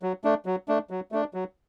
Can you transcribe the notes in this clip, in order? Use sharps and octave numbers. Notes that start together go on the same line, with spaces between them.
F#3
A3 D4
F#3
A3 D4
F#3
A3 D4
F#3